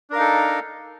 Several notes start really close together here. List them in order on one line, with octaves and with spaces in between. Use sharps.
D4 A#4 F5 D#4 A4